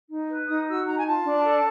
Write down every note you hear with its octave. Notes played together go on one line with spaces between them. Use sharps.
D#4
B4
D#4 D#6
F#4 E6
D#4 A#5
G#5
F4 A5
D4
A4